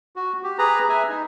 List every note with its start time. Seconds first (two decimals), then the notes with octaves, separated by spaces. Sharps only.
0.16 F#4
0.43 G4
0.58 G#4 B4 A#5
0.89 E5 G#5
1.09 D#4